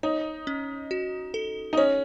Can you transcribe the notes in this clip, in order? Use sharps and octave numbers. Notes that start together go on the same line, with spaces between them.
D#4 C#5
C#4
F#4
A4
D#4
C#4 C#5